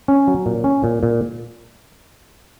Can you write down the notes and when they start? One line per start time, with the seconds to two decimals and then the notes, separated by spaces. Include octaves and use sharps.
0.08 C#4
0.28 F#3
0.46 A#2
0.64 C#4
0.84 A#2
1.03 A#2